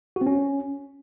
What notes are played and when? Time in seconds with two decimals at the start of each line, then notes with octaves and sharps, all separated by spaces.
0.16 F#4
0.21 C4
0.27 C#4